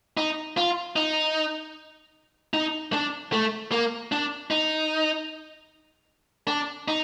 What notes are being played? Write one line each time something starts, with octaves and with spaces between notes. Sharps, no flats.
D#4
F4
D#4
D#4
D4
A3
A#3
D4
D#4
D4
D#4